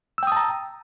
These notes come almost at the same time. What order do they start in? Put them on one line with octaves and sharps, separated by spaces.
E6 G5 D#6 A5 A#5